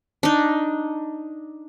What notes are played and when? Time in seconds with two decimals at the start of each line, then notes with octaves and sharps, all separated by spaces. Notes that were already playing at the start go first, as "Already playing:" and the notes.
0.23 D4 D#4